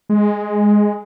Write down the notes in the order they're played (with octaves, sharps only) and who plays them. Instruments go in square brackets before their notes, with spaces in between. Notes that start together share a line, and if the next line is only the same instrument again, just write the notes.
[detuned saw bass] G#3